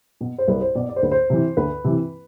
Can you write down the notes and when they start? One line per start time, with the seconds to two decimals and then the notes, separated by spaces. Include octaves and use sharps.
0.21 B2
0.38 C5
0.48 C2 B4
0.61 C5
0.75 B2 D5
0.89 D5
0.96 C5
1.03 D2 B4
1.11 C5
1.30 C3 E3
1.57 D2 B4
1.84 C3 E3